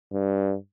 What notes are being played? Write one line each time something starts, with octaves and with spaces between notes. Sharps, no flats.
G2